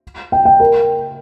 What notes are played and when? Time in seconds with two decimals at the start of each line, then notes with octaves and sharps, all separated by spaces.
0.32 G5
0.45 G5
0.60 A#4